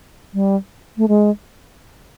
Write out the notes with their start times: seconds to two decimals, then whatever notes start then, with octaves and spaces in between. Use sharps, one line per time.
0.34 G3
0.97 A3
1.08 G#3